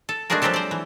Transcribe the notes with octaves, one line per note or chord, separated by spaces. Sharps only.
A4
G#3 A3 D4 F#4 G#4 A#4
F3 F#3 G#3 C4 G4 A4
C5 D5
E3